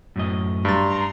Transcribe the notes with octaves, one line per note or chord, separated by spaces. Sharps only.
F#2 A2 D#5
G2 A#5 C6 A6